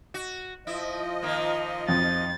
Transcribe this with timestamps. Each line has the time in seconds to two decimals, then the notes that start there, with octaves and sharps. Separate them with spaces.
0.14 F#4
0.67 F3 E4 D#5
1.22 D#3 A#3
1.88 F2 A6